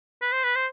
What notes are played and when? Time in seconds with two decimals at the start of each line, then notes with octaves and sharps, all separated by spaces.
0.22 B4
0.32 C5
0.44 B4
0.55 C5